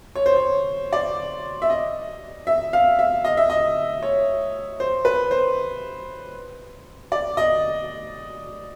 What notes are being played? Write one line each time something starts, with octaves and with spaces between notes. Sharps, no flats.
C#5
C5
C#5
D5
E5
D#5
E5
F5
E5
D#5
E5
D#5
C#5
C5
B4
C5
D5
D#5